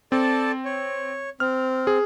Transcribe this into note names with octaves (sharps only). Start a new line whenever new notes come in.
C4 A4 D5 A5
C#5
C4 F6
G#4